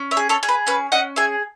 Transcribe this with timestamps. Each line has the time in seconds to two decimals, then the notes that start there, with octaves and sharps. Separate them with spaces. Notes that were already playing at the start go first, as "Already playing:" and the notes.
Already playing: C#4
0.11 C#5 E5
0.17 G#4
0.29 A4 C#5
0.43 G#4
0.49 B4
0.67 C#4 B4
0.92 C#4 D#5 F#5
1.16 G#4 E5 G#5